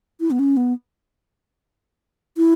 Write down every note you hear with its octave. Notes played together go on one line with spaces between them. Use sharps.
E4
B3
C#4
B3
E4